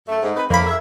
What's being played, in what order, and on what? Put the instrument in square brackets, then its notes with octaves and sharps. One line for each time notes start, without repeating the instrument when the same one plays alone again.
[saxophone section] F#2 A3
G#2
C4 D#4 B4
[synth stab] F2 B5 [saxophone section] C#3 E3 A#3
[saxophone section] G#4 A#4 E5